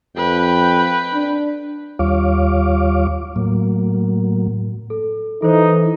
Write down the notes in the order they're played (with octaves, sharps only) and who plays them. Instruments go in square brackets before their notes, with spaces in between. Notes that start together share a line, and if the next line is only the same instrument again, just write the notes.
[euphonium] F2 [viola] B4 G5
[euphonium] D4
[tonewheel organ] D#2 G3 F4 C#5 F5 D6
A2 F#3 A#3
[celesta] A4
[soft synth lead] E3 [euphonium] D#4 [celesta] A4 C5